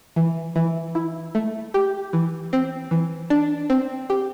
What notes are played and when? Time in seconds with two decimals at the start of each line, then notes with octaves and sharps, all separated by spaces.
0.16 E3
0.56 E3
0.95 E4
1.35 A3
1.74 G4
2.13 E3
2.53 C4
2.91 E3
3.30 D4
3.70 C4
4.10 G4